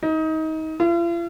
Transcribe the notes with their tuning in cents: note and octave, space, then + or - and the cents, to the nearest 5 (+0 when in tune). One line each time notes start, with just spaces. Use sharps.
D#4 +25
F4 -45